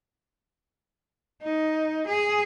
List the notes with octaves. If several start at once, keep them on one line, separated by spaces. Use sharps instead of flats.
D#4
G#4